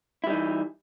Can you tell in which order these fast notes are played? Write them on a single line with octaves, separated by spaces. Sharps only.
E4 G3 D#4 E3